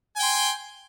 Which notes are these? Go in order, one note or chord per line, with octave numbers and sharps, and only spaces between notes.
G5 G#5 C6